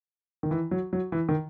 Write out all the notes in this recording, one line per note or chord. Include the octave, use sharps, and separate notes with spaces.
D#3
E3
F#3
F#3
E3
D#3